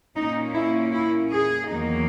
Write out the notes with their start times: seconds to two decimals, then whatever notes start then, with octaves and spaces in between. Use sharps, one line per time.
0.16 A#2 A#3 C#4 D#4
0.54 E4
0.93 E4
1.30 G#4
1.69 E2 D#3 F#3 A#3 D#4